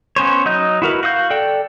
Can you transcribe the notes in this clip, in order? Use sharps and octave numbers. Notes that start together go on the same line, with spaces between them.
B3 C#4 C5 C#5
F#3 D#4 D#5 G6
E4 F#4 A#4 B4
F#4 F5 D#6 G6
A4 D5 G5